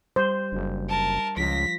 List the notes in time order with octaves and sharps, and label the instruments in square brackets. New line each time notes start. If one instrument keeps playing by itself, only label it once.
[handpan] G3 G4 [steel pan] C5
[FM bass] F#1 [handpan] D4
[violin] A#4 A5
[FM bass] C#2 [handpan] F3 F4 [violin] A#6 B6